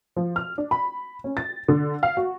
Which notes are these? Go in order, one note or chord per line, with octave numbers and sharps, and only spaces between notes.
F3
F6
D4
B5
C#4
A6
D3
F5
F#4